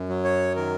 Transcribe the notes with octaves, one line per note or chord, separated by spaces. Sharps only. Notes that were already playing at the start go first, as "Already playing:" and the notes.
Already playing: F#2
F#3
C#5
D#3 A#4